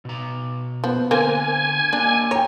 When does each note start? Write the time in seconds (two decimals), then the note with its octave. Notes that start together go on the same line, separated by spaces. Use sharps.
0.05 B2 A#5
0.84 F3 B3
1.11 D3 A#3 C4 A#4 G#5
1.93 A#3 D4 G4
2.31 C#5 G5 A#5